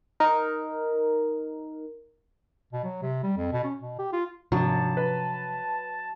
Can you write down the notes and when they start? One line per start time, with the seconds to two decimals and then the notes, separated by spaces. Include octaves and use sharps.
0.20 D#4 A#4
2.73 B2
2.84 F#3
3.02 C3
3.23 G3
3.37 F2
3.52 B2
3.64 C#4
3.80 B2
3.99 G4
4.13 F4
4.52 G#1 C3 F3 F#3 D4 A5
4.97 B4